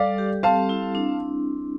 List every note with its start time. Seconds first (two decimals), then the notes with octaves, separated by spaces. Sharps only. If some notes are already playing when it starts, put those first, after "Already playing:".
Already playing: G3 A4 D5 F5
0.18 G4
0.43 C4 F5 A5
0.69 E4
0.95 D4